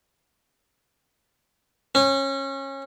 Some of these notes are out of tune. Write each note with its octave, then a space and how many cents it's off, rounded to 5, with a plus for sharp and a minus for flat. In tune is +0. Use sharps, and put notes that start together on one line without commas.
C#4 -25